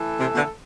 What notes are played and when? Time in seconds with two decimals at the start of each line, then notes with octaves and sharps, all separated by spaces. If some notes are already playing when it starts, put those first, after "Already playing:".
Already playing: E3 A3 E4 A4
0.19 C3
0.35 B2 D3